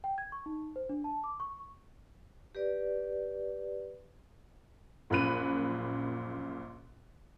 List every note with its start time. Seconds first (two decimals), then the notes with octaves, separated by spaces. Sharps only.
0.04 G5
0.18 G#6
0.32 C#6
0.46 D#4
0.76 C5
0.89 D4
1.04 A5
1.24 D6
1.40 C#6
2.55 G4 B4 D5
5.10 A#1 F#2 A#2 B5 F#6 D#7